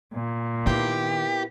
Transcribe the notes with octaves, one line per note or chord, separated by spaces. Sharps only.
A#2
D#3 A#3 B3 E4 G4